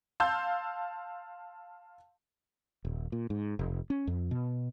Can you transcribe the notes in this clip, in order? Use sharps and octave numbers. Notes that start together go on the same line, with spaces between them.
F5 A5 C6 E6 G6
D#1
A#2
G#2
F1
C#4
F2
B2